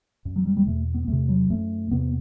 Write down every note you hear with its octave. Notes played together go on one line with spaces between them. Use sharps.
F#2
F#3
G3
G3
E2 B2 A3
B3
E2 C3 A3
F#3
F#2 A3
E2 C3 B3